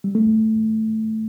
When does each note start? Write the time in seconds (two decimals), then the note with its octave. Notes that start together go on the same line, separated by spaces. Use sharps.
0.04 G3
0.15 A3